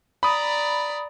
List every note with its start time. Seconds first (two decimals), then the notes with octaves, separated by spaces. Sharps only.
0.23 D5 A#5 B5 D#6